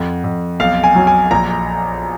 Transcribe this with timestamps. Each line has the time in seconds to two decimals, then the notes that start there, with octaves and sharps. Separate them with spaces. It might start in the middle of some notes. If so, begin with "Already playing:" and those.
Already playing: F2 F#5
0.24 F2
0.60 B1 F5
0.84 G#5
0.95 F#3
1.07 G#5
1.31 A#1 A#5